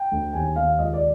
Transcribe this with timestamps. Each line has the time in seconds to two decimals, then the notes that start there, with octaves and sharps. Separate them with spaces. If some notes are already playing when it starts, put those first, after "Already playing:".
Already playing: G5
0.12 D2
0.33 D#2 G#5
0.56 D#2 F5
0.78 C#2 D#5
0.94 D5